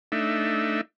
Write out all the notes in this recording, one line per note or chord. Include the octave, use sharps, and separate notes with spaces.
A3 D4 D#4 E5